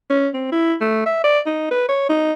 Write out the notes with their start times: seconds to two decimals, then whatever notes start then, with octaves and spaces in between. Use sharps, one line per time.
0.10 C#4
0.34 C4
0.52 E4
0.81 A3
1.06 E5
1.24 D5
1.46 D#4
1.71 B4
1.89 C#5
2.09 D#4